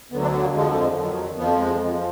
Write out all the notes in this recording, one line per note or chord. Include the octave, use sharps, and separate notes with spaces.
D2 D3 F#3 B3
D4
B3
A#3
F2 D3 F3 G#3
F2 D#3 F#3
F2 F3 B3
G#3
F2 F3